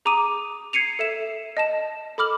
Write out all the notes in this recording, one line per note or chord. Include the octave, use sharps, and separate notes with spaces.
G#4 A#5 D6 D#6 D#7
G#6 C7 C#7 D#7 F7
A4 E5 E7
D#5 A5 E7
A4 B5 D6 F6 F#7